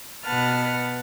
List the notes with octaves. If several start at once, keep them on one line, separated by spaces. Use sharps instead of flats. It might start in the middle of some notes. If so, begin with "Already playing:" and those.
B2 B4 F#5 A5 F6